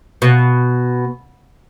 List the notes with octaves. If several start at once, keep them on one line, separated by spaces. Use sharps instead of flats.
B2